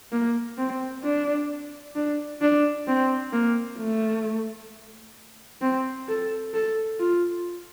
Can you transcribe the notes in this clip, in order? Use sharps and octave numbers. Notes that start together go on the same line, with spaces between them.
A#3
C4
D4
D4
D4
C4
A#3
A3
C4
A4
A4
F4